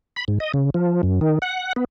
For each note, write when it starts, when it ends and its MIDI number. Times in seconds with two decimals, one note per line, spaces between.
0.16 0.25 83
0.28 0.38 44
0.40 0.52 75
0.54 0.70 49
0.74 1.02 53
1.03 1.20 42
1.21 1.39 51
1.42 1.73 78
1.76 1.84 59